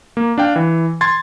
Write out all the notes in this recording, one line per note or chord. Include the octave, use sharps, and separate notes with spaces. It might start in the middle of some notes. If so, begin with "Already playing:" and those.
A#3
D4 F5 G5
E3
C6 G#6 A6